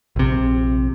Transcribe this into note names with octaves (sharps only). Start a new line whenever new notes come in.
A#1 C3